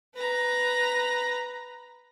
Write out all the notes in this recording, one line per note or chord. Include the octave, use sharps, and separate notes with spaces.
B4 A#5